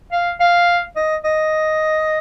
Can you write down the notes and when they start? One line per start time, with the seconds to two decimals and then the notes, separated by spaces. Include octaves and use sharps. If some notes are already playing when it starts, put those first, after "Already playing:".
0.12 F5
0.40 F5
0.96 D#5
1.24 D#5